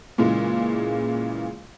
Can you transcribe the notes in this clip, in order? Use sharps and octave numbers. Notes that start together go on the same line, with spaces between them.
A#2 C#3 E3 G#3